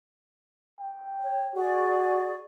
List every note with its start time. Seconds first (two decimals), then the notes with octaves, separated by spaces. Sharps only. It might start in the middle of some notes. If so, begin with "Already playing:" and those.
0.80 G5
1.20 C#5
1.55 F#4 G#4 D5 C#6